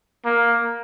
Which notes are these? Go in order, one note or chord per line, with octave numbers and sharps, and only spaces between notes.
A#3